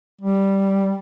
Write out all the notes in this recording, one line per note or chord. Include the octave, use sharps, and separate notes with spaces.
G3